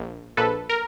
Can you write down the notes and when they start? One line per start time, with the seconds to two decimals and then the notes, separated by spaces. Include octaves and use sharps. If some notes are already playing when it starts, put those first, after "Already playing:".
Already playing: A#1
0.37 A#1 A4 B4
0.69 A#4